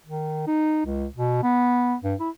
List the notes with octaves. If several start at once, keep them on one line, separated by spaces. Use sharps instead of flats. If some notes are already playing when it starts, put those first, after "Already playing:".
D#3
D#4
C#2
B2
B3
G2
E4